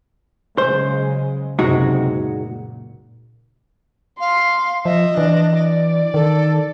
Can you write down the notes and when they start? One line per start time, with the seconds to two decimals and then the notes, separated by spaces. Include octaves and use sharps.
0.58 C#3 F#3 G#3 C5
1.59 F#1 C#2 C3 G#3 D#4 F#4
2.12 A#2
4.20 F5 C6
4.85 F3 D#5 E5
5.17 E3 D4
5.58 D5
6.14 D#3 A4